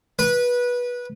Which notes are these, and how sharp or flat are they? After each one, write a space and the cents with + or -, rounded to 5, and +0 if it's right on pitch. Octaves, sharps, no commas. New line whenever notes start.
B4 -20